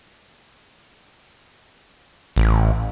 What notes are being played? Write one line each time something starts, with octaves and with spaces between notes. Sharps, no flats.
A1